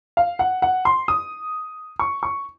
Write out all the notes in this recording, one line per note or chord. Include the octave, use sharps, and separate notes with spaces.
F5
F#5
F#5
C6
D#6
C#6
C#6